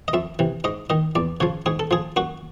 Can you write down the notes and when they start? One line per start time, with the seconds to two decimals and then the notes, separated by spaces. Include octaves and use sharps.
0.08 D#5
0.13 F2 E5
0.39 C3 E3
0.64 G#2 D#5
0.90 D#3 D#5
1.15 E2 D5
1.40 C#3 F3 C#5
1.66 G#2 G#4
1.80 A4
1.91 F3 G#4
2.16 F#2 F#4